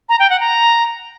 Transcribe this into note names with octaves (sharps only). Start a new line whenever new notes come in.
A#5
G5
F#5
A#5